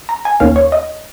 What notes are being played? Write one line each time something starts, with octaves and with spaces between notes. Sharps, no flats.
A#5
G#5
D#2 D#3 A#3 C#4 F5
C#5
D#5